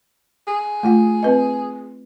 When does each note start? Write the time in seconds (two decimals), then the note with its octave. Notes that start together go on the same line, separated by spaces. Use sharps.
0.48 G#4
0.83 A3 F4 G5
1.23 C4 B4 D#5